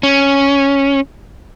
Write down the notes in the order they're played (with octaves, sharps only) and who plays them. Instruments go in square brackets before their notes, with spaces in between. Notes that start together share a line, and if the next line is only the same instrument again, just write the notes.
[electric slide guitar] C#4